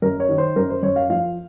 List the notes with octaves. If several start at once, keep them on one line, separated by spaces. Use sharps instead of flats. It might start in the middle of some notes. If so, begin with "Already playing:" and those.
F#2 A#4
C#5
D#3
C5
F#2 A#4
C5
F#2 C#5
F5
F3 F5